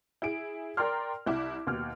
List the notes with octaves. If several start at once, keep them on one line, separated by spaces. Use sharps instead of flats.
E4 G#4 D7
A#4 D5 G5 A#5 C6 F6
C2 E4 D6
D#2 B2 F6